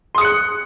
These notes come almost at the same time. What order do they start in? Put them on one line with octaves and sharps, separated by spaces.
C6 D#6 C#7 F#6